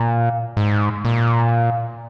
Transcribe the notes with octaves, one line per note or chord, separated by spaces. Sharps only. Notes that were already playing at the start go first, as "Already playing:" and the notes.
Already playing: A#2
G#2
A#2